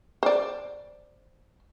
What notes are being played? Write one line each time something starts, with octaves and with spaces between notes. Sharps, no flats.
C5 D5